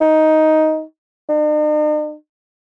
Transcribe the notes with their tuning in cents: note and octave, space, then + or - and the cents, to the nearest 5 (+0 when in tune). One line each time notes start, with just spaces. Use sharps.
D#4 +10
D#4 -45